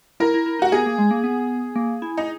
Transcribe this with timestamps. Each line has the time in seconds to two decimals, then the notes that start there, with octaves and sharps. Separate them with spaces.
0.20 E4 A#4
0.34 E4
0.46 E4
0.59 D#4 F#4
0.72 B3 G#4
0.86 A#3
0.98 G#3
1.11 A#3
1.24 B3
1.76 A#3
2.02 E4
2.17 D#4